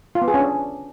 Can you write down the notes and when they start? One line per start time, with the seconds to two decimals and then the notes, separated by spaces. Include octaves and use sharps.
0.15 F4
0.22 B3
0.28 G#4
0.34 C#4
0.40 D4